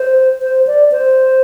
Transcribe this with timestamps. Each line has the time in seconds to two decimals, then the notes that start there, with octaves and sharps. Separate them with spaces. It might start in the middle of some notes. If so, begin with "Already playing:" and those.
Already playing: C5
0.42 C5
0.67 D5
0.92 C5